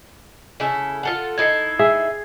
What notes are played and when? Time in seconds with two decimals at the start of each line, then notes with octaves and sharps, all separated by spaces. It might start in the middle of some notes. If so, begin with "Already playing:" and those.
0.60 C#3 E4 A4
1.03 F4 A4 F#5
1.38 D#4 E4 A4 G#6 C7
1.79 G#4 E5